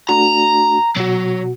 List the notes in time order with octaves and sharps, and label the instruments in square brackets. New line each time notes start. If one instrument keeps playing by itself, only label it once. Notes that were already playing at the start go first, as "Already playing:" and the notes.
[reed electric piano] A3 D4 F#4 [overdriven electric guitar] A#5
[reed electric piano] B2 F#4 [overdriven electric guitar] F#3